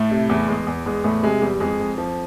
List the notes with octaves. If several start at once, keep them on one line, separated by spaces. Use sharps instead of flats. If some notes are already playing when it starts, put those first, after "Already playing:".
Already playing: A2 A3
C3
E2
E2 G#3
E2
E2 G#3
E2 A2 A3
C3 G#3
E2 G3
F2 G#3
F2
F3